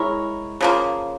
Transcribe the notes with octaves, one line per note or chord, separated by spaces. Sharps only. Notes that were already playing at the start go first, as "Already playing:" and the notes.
Already playing: G#3 E4 A#4 C#5
C#3 F3 A#3